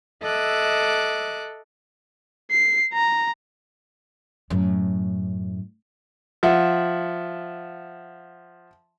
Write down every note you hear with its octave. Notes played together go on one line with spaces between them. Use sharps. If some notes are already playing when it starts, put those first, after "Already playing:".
A4 D#5 E5 D6 F#6
C7
A#5
F#2 A2
F3 E5 F#5